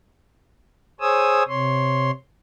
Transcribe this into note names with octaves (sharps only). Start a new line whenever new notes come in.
G#4 C5 C#5 G#5 D#6 E6
C3 C#5 C6